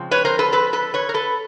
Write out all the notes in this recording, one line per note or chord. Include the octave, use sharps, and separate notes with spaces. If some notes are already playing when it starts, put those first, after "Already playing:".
Already playing: C#3 F3 G#3 C4
B4 C#5
A#4 C5
A4 B4
A4 B4
A4 B4
B4 C#5
A#4
A4 B4